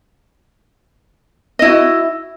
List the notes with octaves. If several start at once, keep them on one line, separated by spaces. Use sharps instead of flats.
E4 F#4 D#5